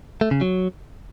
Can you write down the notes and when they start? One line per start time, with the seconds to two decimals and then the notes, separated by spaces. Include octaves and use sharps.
0.21 A3
0.31 C#3
0.41 F#3